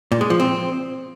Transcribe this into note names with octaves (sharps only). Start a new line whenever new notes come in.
A#2
G#3
F3
C4